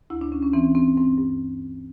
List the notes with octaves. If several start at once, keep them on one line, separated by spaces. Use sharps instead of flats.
D2 E4
D4
D2 C#4
C#4
E3 C4
G2 C4
G2 C4
G2